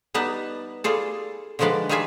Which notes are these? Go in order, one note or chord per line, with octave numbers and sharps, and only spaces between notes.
G3 B3 D#4 B4 A5
G3 F4 G#4 A4
D3 D#3 F3 G#3 B4 D5
D#3 G3 F4 G#4 E5 G#5